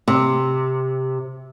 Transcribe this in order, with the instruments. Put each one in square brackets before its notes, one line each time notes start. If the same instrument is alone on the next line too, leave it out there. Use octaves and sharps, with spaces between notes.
[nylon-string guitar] C3